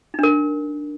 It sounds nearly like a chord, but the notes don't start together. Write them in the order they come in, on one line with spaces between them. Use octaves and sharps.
D#4 D4 A#4